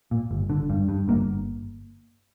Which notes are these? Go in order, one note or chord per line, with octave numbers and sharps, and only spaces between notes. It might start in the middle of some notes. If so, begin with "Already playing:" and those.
A#2
G1
D3
G2
G2
G1 A#3